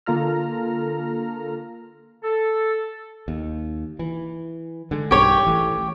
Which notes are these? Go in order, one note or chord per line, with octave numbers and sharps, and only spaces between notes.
D3 A#3 F4 A4 A#5 F6
A4
D#2
E3
D3 G#3
B1 G2 D#3 G4 C#5 G5
A1 E3 A3